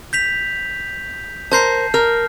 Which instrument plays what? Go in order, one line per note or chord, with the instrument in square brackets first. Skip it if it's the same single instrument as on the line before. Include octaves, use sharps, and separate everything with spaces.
[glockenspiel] G6 B6 F7
[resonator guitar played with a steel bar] A#4 C5 [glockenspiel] A5 G6 C7
[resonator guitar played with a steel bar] A#4 [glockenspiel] F6